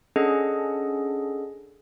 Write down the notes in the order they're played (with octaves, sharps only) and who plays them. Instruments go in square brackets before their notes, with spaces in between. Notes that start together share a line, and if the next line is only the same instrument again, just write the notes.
[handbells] C#4 D4 G#4 A4 D#5 F#5